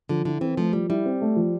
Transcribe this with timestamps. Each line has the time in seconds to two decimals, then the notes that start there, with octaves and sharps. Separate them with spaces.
0.09 D3 F3
0.25 D3 E4
0.41 E3 C4
0.57 F3 A3
0.73 F3 G3
0.90 G3 E4
1.06 C4
1.21 A3
1.36 F3